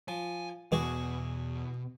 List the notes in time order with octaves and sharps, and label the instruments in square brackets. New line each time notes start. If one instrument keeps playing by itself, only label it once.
[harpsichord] F3 [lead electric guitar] G#5
[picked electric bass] E2 [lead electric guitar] B2 [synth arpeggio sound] E3 G#3 [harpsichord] F#4 G#4 D6